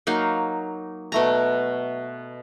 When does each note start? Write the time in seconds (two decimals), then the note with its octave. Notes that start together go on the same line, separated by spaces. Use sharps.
0.07 F#3 A#3 D#4 F5
1.12 B2 A3 A#5